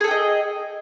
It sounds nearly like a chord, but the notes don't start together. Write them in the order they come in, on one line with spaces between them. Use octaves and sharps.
G#4 A4 G5 D#5